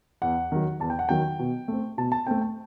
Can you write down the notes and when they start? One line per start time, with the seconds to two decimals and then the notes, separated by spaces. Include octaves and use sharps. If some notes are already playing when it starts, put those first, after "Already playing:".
0.22 E2 F#5
0.52 D#3 F#3
0.80 E2 A5
0.90 G5
0.99 F#5
1.09 D#3 F#3 G5
1.39 B2
1.68 A3 C4
1.98 B2 A5
2.12 A5
2.27 A3 C4 G5
2.41 A5